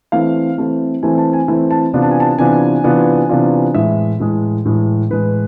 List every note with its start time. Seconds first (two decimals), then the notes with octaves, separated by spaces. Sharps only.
0.12 E3 A3 C4 E4 F5
0.58 E3 A3 C4 E4
1.03 E3 A3 C4 E4 G#5
1.18 A5
1.33 G#5
1.48 E3 A3 C4 E4 E5
1.71 A5
1.94 C3 E3 B3 D4 F4
2.02 A5
2.11 G#5
2.20 A5
2.38 C3 E3 B3 D4 F4 G#5
2.84 C3 E3 B3 D4 F4
3.29 C3 E3 B3 D4 F4
3.74 A2 E3 G#3 E5
4.20 A2 E3 G#3
4.65 A2 E3 G#3
5.10 A2 E3 G#3 B4